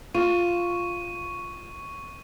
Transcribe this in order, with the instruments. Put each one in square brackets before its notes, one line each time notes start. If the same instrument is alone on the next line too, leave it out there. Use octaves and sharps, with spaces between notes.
[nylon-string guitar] F4 [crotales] C#6 D#7